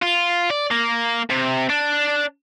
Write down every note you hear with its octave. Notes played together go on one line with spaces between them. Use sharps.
F4
D5
A#3
C3
D4